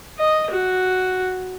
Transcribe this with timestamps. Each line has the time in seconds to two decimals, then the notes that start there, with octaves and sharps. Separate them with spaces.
0.18 D#5
0.51 F#4